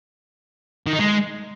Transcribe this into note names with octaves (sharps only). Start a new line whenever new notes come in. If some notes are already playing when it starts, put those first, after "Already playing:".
D#3
D#4
G#3